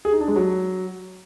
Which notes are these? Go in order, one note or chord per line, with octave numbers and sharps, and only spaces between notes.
G#4
D#4
D4
G#3
F#3